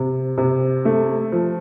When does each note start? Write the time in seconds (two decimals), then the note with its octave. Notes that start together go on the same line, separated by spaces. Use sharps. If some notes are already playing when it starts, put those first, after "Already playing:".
Already playing: C3
0.38 C3
0.85 A3
1.32 F3